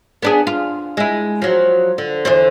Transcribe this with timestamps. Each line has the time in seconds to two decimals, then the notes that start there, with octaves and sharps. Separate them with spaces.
0.22 B3 D4 G#4
0.47 F4
0.97 G#3 E4
1.42 F3 F#3
1.98 D3
2.25 E2 D3 C5